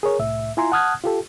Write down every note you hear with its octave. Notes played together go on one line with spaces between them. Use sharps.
G#4 A#4 C#5
C2 A2 E5
E4 F4 G#5 A#5 C6
F#5 A5 D#6 F6 F#6 G#6
F4 G4 A4